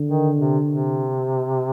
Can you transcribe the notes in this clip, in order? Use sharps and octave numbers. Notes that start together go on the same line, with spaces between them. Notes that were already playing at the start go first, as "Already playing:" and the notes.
Already playing: D3
D#3
C3
C3